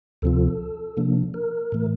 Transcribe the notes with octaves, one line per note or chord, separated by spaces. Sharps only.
D2 C3 F3 C4 F4 A4
C3 F3 A#3 D4
A#4
A2 E3 A3